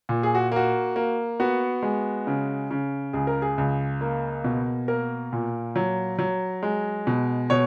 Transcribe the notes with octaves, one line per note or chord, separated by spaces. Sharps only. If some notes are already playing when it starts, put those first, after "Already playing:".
A#2
G#4
F#4
A#3 F#4
A#3
B3 F#4
G#3
C#3
C#3
C#2 G#4
A#4
G#4
C#2
A#3
B2
A#3 A#4
A#2
F#3
F#3
G#3
B2
B2 C#5